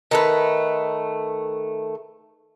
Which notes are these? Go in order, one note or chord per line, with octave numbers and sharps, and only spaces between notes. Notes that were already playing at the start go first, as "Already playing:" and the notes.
D#3 A3 B4